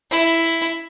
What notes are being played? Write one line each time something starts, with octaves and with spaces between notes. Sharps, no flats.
E4